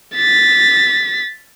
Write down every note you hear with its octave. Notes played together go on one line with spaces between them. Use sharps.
A6 B6